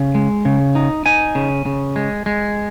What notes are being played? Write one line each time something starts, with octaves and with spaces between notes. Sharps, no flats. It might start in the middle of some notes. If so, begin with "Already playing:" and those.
Already playing: C#3
G#3
C#3
D#4
D#4 G#5
C#3
C#3
G#3
G#3